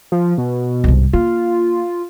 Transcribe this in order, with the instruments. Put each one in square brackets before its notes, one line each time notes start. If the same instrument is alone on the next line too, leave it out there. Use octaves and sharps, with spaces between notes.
[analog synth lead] F3
B2
[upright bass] C2 G#2
[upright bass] A#3 [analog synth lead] F4